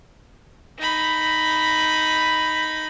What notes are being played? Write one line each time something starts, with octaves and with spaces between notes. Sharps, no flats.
D#4 B5